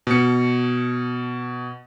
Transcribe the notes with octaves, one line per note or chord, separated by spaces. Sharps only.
B2 C#7